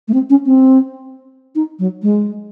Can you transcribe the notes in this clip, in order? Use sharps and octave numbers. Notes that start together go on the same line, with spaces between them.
A3
C4
C#4
C4
D#4
F#3
G#3